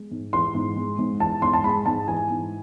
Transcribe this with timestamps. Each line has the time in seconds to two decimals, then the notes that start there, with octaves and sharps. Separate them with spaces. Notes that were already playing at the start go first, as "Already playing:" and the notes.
Already playing: G#3
0.11 G#2
0.33 E3 C6
0.55 G#2
0.76 G#3
0.99 G#2
1.20 E3 A5
1.42 G#2 C6
1.53 A5
1.64 G#3 B5
1.86 G#2 A5
2.08 E3 G#5
2.30 G#2